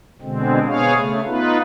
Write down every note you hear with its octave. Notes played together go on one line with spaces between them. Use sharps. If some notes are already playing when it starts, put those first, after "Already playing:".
B2 D3 G#3 C4
B3 G#4 C#5 F5
C#3 A3
B3 D#4 F4 B4